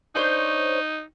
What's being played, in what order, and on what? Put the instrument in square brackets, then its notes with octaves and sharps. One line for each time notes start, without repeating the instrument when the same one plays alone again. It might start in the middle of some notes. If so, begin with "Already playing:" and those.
[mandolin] D4 C5 C#5 [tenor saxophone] D#4